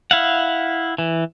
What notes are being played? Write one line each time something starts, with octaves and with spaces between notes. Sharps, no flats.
E4 F5 F#5
E3